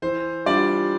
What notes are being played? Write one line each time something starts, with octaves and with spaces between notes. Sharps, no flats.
E3 C5
G3 D4 F4 D5